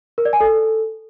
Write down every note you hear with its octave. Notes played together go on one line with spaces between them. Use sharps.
A#4
D5
G#5
A4